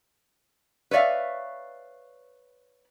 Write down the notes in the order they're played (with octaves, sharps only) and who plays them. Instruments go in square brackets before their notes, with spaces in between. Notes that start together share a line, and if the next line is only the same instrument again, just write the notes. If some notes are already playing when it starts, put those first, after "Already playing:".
[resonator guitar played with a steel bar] B4 C#5 D5 E5 F5